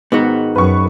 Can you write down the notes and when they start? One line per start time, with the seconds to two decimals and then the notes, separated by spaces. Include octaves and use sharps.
0.12 G#2 D#3 B3 F#4
0.56 F#2 B4 C#6